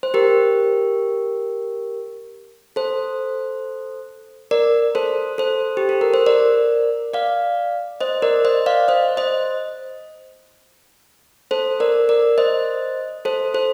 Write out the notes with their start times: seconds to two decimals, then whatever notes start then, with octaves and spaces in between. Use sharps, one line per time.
0.03 C5
0.14 G4 A#4
2.76 A4 C5
4.51 A#4 D5
4.95 A4 C5
5.38 A4 C5
5.77 G4
5.89 A4
6.01 A#4
6.14 C5
6.26 A#4 D5
7.14 D5 F5
8.01 C5 D#5
8.22 A#4 D5
8.45 C5 D#5
8.66 D5 F5
8.88 C5 D#5
9.17 C5 D#5
11.51 A4 C5
11.80 A#4 D5
12.09 A#4 D5
12.38 C5 D#5
13.25 A4 C5
13.54 A4 C5